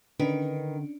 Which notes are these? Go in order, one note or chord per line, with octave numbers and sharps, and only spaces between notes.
D3 D#3 C#4 D4 B4